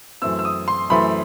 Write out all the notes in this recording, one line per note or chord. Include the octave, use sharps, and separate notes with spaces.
F#2 E3 A3 C4 E6
E6
D#6
C6
F#2 E3 A3 C4 B5